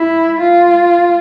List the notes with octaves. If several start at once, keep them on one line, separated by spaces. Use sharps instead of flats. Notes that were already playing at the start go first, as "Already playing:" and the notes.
Already playing: E4
F4